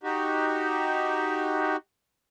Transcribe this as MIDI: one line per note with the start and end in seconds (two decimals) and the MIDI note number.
0.03 1.76 63
0.03 1.76 66
0.03 1.76 67